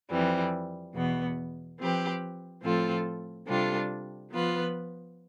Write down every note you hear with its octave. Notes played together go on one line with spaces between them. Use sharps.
F2 E3 G3 C4
E2 B2 B3
F3 C4 G4 B4
A2 F3 C4 F4 A4
C3 G3 D4 F4 A4
F3 B3 F4 B4